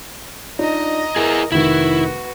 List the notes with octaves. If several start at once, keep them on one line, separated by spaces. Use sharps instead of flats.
D4 D#4 F4 D#5 A#5
E4 G#4 A#4
F1 D#3 E4 F#4 B4